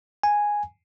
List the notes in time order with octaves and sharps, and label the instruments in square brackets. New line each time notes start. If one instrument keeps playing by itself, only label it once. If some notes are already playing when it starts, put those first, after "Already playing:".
[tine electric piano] G#5